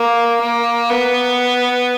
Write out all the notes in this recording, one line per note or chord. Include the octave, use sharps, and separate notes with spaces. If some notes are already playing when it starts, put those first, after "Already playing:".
Already playing: A#3
A#3
B3